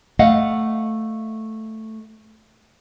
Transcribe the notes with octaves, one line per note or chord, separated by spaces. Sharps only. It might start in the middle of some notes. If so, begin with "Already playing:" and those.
A3 D#5 F5 F#5